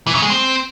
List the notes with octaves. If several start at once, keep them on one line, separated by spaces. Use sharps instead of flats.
E3
C#3
G#3
C4